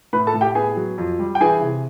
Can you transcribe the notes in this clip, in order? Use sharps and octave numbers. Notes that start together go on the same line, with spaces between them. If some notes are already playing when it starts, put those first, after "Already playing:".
A2 B4 B5
A4 A5
A2
G4 G5
B3 G#4 G#5
F#3
F2
G3
G5
E3 G#4 G#5
C3